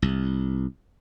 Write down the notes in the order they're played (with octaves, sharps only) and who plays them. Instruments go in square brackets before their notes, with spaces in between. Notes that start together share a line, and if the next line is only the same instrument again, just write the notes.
[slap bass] C2